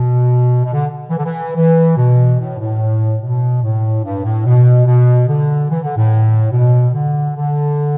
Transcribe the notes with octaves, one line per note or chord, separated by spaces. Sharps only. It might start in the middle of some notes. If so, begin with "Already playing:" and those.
Already playing: B2
B2
D3
E3
D3
E3
E3
B2
A2
A2
B2
A2
G2
A2
B2
B2
D3
E3
D3
A2
B2
D3
D3